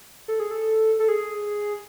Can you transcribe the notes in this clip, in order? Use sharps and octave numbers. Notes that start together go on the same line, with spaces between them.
A4
G#4
A4
A4
G#4